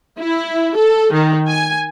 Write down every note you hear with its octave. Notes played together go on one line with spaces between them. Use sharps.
E4
A4
D#3
G#5